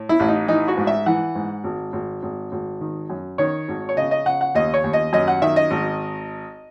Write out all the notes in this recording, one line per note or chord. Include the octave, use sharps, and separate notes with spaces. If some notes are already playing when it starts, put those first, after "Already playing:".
Already playing: A2
E4
A1
D#4
E3 D#4
F#4
G#2
E5
E3 F#5
G#2
G#1
G#1
G#1
G#1
D#3
F#2
D#3 C#5
G#1
C#5
C#3 D#5
D#5
C#3 F#5
F#5
D#2 D#5
C#5
D#2
D#5
F#2 D#5
F#5
D#3 E5
D#5
G#1